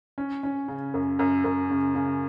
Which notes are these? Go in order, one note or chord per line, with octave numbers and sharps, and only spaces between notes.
C#4
C#4
C#3
F#2
F#2
F#2
C#3
C#3